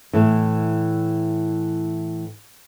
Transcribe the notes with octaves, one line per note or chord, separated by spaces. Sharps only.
A2 E3